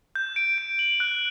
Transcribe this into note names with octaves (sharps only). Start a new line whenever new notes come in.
G6
D7
D7
F#7
F#6